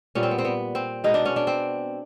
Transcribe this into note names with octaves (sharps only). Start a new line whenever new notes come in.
A#2 G3 B3 C#4
C4
B3
C4
B3
C4
B2 G#3 B3 D#4
D4
C#4
D4
C4